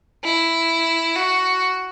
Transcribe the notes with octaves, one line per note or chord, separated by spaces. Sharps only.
E4
F#4